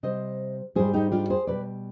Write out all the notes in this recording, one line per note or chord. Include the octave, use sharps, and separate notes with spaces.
C3 G3 C5 D#5
G#2 G3 G#4 C5
D#4 G4
D4 F4
G#4 C5
B2 G3 B4 D5